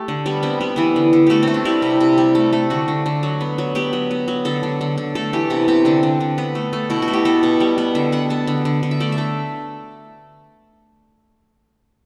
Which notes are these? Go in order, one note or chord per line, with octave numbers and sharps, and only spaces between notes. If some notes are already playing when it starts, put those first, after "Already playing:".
Already playing: A3 G4
D3
G3 B3
B3 C4
G3 B3
E3 B3
D3
D3
A3 F#4 G4
A3 C4
D4
G3 E4
C3
C3
G3
A3
A3
D3 F#4
D3
D3
F#3
B3
F#3
B3 G4
F#3
B3
F#3
D3 A4
D3
D3
D3
A3 A4
E3 G4
C3 B3
C3 C4
D3 D4
D3
D3
B3
A3
A3
B2 E4
F#4
A3
G4
B3 A4
B2
G3
B3
D3 E5
B3 F#5
B3 A5
D3
D3
D3
E5
A3 D5
E5
A3